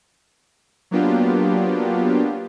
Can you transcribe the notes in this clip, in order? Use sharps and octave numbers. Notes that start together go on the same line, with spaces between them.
F#3 A#3 B3 D4 F4 G4